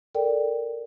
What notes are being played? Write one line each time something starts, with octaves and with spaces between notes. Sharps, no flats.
A4 A#4 D5 G5